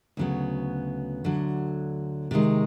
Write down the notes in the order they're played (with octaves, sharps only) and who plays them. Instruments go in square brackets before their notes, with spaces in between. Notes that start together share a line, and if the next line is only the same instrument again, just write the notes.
[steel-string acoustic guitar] D2 C#3 F#3 B3
D2 D3 F#3
C3 D#3 G#3